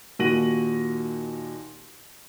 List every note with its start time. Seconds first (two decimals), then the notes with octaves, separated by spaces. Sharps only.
0.19 D#2 A#2 F#4 A#6 D#7 F#7